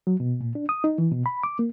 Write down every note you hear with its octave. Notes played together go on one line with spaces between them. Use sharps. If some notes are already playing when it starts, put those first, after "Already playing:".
F#3
B2
A#2
D4
D#6
D#4
E3
B2
B5
D6
A#3